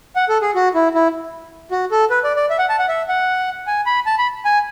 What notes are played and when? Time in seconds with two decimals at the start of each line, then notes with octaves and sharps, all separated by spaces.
0.16 F#5
0.29 A4
0.42 G#4
0.55 F#4
0.75 E4
0.94 E4
1.71 F#4
1.91 A4
2.10 B4
2.24 D5
2.37 D5
2.50 E5
2.59 F#5
2.69 A5
2.79 F#5
2.89 E5
3.09 F#5
3.67 G#5
3.86 B5
4.06 A5
4.18 B5
4.45 G#5